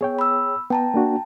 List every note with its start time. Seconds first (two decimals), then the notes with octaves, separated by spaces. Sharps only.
0.01 B3 G#4 C#5 G5
0.19 B5 E6
0.70 B3 G5 A5 A#5
0.94 A#3 D4 F#4